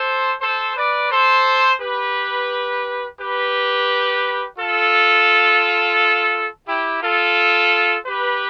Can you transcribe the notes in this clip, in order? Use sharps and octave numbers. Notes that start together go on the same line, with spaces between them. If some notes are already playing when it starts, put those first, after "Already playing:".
Already playing: A4 C5
A4 C5
B4 D5
A4 C5
G4 B4
G4 B4
F4 A4
E4 G4
F4 A4
G4 B4